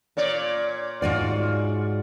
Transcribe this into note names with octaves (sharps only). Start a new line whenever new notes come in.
A#2 C#5 D5
G#2 F4 F#4 D5